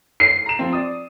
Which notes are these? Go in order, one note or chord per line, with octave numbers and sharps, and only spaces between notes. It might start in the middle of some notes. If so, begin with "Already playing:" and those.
C7
A#5 E7
F3 C4
D5 D#6